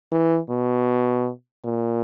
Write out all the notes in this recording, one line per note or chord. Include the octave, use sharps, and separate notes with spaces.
E3
B2
A#2